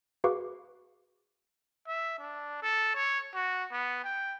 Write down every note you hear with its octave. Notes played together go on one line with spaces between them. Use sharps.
F#4 G#4 B4 F5 C#6 D6
E5
D4
A4
C#5
F#4
B3
G5